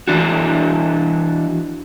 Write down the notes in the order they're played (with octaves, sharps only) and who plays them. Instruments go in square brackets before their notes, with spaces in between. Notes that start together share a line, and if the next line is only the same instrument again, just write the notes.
[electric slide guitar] E3 D4 F#4